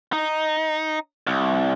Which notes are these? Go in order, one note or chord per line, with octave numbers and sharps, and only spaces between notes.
D#4
C2